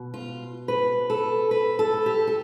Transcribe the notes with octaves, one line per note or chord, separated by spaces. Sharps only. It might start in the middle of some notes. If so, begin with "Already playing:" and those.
Already playing: B2
F4
B4
A4
B4
A4
G4
A4